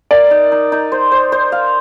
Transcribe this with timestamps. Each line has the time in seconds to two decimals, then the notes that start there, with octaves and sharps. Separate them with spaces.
0.11 A#4 D5
0.31 D#4
0.52 D#4
0.72 D#4
0.92 C5
1.12 C5
1.32 C5
1.52 F5